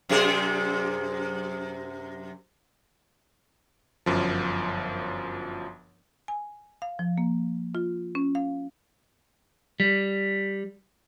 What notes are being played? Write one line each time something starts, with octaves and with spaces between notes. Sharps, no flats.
F#2 C3 G#4
G1 F#2 F3
G#5
F5
F3
A#3
F4
C#4
F5
G3